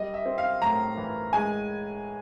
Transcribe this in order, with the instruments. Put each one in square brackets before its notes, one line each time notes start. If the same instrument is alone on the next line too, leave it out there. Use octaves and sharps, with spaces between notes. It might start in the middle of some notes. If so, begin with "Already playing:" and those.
Already playing: [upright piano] G3 D#5
E5
C4
F5
A2 A#5
E3
G#3 G#5